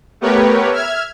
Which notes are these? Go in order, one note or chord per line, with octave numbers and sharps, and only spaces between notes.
A3 B3 G4 A#4 B4 C#5
E5 F6 G#6